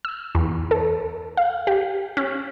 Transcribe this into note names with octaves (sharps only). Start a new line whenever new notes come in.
E6
E2
A4
F5
G4
C#4